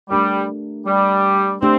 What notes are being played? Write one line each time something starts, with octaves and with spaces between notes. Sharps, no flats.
G3 A3 D4 G4 A#4
G3
A3 C4 D4 G4